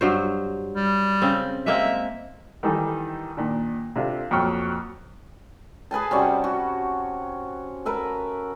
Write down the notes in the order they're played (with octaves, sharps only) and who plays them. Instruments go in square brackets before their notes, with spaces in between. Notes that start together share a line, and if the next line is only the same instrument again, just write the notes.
[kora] G2 F#3 C5
[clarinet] G3
[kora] C#3 C4
[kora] G#3 A#3 C4 [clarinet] E5
[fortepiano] D#3 E3 G3 D#4 A4
A#2 D#3 D4
C3 D4 F4 A4
F2 A#2 F#3 G5 C#6 F6
[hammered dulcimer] G#4 B4 G#5 A5
C3 G3 C#4 F#4
F#4
A#4 B4 E5 A5